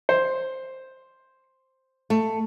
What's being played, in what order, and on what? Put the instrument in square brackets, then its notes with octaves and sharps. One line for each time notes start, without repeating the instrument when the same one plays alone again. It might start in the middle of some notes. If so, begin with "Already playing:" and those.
[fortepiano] C5
[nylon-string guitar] A3